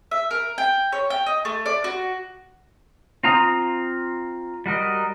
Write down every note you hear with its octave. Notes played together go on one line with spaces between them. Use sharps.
E5
A#4
G5
C#5
G5
D#5
A3
D5
F#4
C4 F4 A#5 D#6
G3 F#4 A#4 D#5